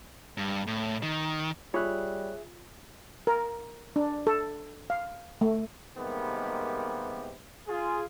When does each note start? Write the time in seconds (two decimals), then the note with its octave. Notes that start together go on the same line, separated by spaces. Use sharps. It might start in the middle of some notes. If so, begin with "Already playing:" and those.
0.38 G2
0.67 A2
1.03 D#3
1.74 G3 F4 G#4 C#5 E5 F#6
3.27 A#4
3.96 D4
4.27 A4
4.90 F5
5.41 A3
5.98 C3 D#3 G3 G#3 A#3 B3
7.67 F4 G#4